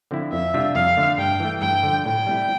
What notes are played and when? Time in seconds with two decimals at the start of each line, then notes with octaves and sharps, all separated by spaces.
0.11 D3 F3 C4 E4
0.33 F2 E5
0.54 C3 G3 D4 F4
0.75 F2 F5
0.97 D3 A3
1.18 G2 G5
1.40 E3 A3
1.61 G2 G5
1.83 D3 F3
2.05 A2 G5
2.27 G3 C4 E4